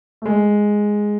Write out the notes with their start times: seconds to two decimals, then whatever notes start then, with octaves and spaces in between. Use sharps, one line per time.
0.22 A3
0.25 G#3